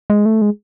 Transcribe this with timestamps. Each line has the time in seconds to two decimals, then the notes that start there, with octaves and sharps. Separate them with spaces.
0.10 G#3
0.26 A3
0.42 G#3